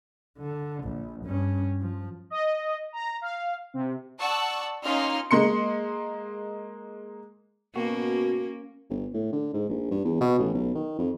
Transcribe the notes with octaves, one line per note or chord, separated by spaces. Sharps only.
D3
A#1
G2 C#4
F3
D#5
A#5
F5
C3
D5 F#5 A5 C#6 E6
A#3 C#4 D#4 F4 C6 F6
G#3 A#3 C6 C#7
B2 A#3 C#4 F#4
G1
A2
D3
G#2
A#1
G2
E2
B2
A1
B1
D#3
F2